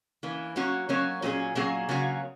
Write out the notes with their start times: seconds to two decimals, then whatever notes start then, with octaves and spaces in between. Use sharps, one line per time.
0.23 E3 A#3 C#4
0.56 F#3 A#3 C#4 F#4 C#5
0.89 F#3 A#3 C#4 F#4 C#5
1.22 A#2 F#3 A#3 C#4 G#4
1.55 A#2 F#3 A#3 C#4 G#4
1.89 C#3 F#3 A#3 C#4 F#4